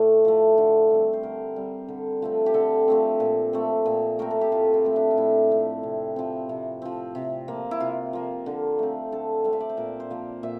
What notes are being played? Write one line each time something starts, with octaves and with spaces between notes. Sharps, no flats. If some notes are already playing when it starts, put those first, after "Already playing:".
Already playing: A2 A3 D5 G5
F3 A3
D3
G3 C4
C5
D3 A#4
G3 C4
D3
F3 A3 C4
G4
D3 A4
F3 A3 C4
A#2
A3 C4
A#2
A3 C4 A#4
A4
G4
A2 F4
E4
F3 A3 C4
D4
F4
A2 E4
F3 A3 C4
C3
F3 C4
C3
F3 C4
C3
F3 A#3
E4
C3 F4
F3 A#3
D3
A3 C4
D3 A4
A3 C4 F5
E5
D5
C5
A#2 A#4
C5
F3 A#3
A#2 E5